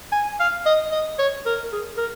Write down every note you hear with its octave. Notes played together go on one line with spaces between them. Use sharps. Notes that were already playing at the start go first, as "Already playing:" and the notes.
G#5
F5
D#5
D#5
C#5
A#4
G#4
A#4